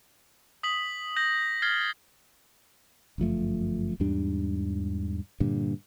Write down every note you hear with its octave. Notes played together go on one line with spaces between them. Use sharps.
D#6 B6 F#7
G6 A#6 F#7
F6 G#6 A6 C7 G7
G1 F#2 F3 A3
E2 G#2 G3 D4
G2 A#2 D3